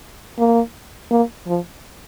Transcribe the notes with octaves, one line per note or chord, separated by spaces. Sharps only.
A#3
A#3
F3